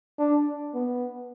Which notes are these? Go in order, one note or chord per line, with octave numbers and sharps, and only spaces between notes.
D4
B3